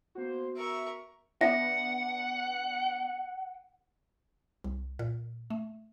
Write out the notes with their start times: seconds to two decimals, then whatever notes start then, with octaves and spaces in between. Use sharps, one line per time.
0.15 A#3 B3 F#4 C5
0.56 A#4 E5 C#6
1.41 B3 D4 E5 F#5
4.64 C2
4.99 A#2
5.50 A3